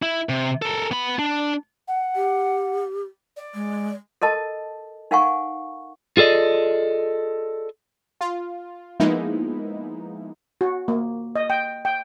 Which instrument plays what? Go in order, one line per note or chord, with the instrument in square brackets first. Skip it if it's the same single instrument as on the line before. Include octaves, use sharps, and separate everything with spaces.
[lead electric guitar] E4
C3
A4 A#4
B3 B5
D4
[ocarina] F#5
[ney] G4
[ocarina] D5
[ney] G#3
[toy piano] A4 A#4 D#5 A5
D#4 A#4 F5 F#5 G#5 C#6
[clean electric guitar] F4 G#4 A4 D5 D#5
[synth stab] F4
F3 G#3 A#3 B3 D#4 E4
[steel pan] F#4
A#3
D#5
G5
G5